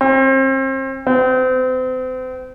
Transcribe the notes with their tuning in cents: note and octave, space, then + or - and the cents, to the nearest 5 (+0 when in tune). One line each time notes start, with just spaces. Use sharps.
C4 +35
C4 -35